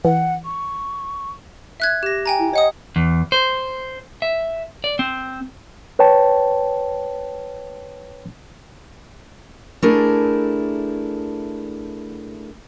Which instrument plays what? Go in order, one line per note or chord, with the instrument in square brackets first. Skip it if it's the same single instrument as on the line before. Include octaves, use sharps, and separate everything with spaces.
[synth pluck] E3 [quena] F#5
[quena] C#6
[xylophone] E5 F#6 G#6
G4 A#6
G5 G#5 A#5
[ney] E4
[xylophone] C#5 F#5 D#6 [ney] D#5
[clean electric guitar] E2
C5
E5
D5
C4
[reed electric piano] B4 C#5 G5 A5
[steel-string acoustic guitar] A3 D4 E4 G#4 A#4